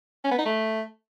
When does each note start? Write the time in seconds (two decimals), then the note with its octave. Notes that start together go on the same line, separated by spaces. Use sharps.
0.25 C#4
0.31 B3
0.38 D#4
0.45 A3